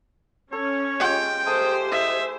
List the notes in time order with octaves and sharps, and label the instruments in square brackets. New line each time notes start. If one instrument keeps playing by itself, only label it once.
[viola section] C#4 [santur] A4 [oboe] C#5
[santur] G#3 F4 G4 [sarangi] G5
[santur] A3 G#4 D#5 [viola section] G4 C5 [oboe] D#6
[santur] E4 [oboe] D#5 [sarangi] E5